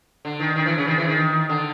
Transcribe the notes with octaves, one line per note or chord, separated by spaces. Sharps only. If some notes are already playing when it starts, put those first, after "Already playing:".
D3
D#3
D#3
E3
C#3
D#3
E3
D#3
D3